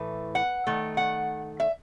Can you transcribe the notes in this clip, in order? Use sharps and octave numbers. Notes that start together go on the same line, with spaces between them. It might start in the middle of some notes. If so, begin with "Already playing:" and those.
Already playing: A2 E3 A3
F#5
D#3 A3
F#5
E5